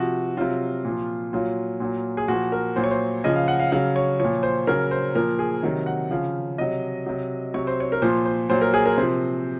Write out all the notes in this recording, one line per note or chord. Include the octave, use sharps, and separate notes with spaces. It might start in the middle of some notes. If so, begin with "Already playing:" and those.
Already playing: C3 F3 F#4
C3 F#3 F4
A#2 F3
A#2 F#3 F4
A#2 F#3
G#4
A#2 F3 F#4
A#4
A#2 F#3 C5
C#5
C5
C#3 F3 D#5
F5
F#5
F5
C#3 F#3 F5
C#5
A#2 F3 C#5
C5
C#3 F#3 A#4
C5
A#2 F3 A#4
G#4
C3 D#3 F#3
F#5
C#3 F3 F5
C3 F#3 D#5
C3 F#3
C3 F#3 C#5
C5
C#5
A#4
A#2 F3 C5
C5
A#2 F#3 C5
A#4
G#4
A#4
C3 F3 C5